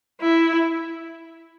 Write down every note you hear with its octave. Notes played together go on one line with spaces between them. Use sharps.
E4